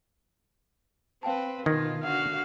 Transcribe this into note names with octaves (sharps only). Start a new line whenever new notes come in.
C4 B4 F5 G5 A5
B2 D#3 F4 G#6 A#6
D3 F#4 F5 F#5